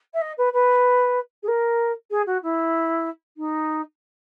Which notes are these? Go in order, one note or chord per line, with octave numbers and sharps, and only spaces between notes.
E5
D#5
B4
B4
G#4
A#4
G#4
F#4
E4
D#4